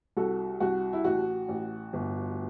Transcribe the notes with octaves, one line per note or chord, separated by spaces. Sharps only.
C2 F#4 A4
C2 F#4
E4
A1 F#4
A1
G1